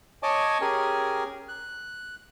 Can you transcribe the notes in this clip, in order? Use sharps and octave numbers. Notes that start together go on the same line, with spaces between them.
C#5 D#5 G#5 A5 D6
C#4 G4 G#4 A#4 G#5
F#6